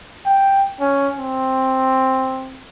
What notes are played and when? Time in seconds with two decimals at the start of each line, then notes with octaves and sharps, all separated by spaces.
0.26 G5
0.81 C#4
1.19 C4